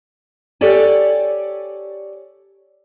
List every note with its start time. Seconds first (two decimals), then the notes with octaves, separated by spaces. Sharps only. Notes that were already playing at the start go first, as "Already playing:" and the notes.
0.61 G4 A4 C#5 D5 G#5